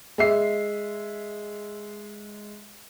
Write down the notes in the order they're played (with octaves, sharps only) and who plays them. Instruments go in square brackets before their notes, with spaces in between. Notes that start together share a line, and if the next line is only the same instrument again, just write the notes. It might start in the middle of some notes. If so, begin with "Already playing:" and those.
[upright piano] G#3 E5 C7